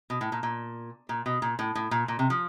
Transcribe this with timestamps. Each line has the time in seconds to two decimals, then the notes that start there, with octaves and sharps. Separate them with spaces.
0.10 B2
0.21 A2
0.32 A#2
0.43 A#2
1.09 A#2
1.26 B2
1.42 A#2
1.59 A2
1.75 A2
1.91 A#2
2.08 A#2
2.19 C3
2.30 F3